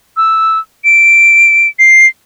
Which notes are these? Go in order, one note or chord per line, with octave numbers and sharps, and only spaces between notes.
E6
D7
C7